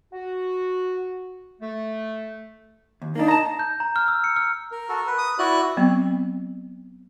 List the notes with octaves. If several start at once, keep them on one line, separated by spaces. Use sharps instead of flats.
F#4
A3
D#2
A#3 D4 D#4
A5 A#5
G6
A#5
F6
E6
C#7
F6
A#4
F#4 A4
B4
D#6
E4 F#4 B4 D5 F#6
F#3 B3 C4